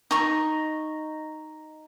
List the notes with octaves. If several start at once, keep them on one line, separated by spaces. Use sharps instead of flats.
D#4 C#6